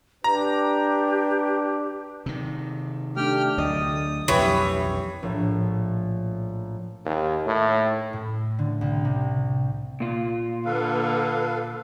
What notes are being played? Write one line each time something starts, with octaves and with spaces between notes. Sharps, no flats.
D4 G4 B4 A#5
C3 D#3
A3 D4 G4 G5 F6
D2 D3 F#3 D5 D#5 D#6
B1 F2 E3 E4 G4 B4 C#5
A#1 A2
D#2
A2
A2
D3
C2
C3
A#2 F4
D3 A#3 A4 B4 F5